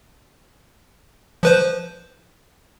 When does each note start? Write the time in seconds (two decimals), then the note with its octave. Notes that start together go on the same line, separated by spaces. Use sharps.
1.43 F3 B4 C5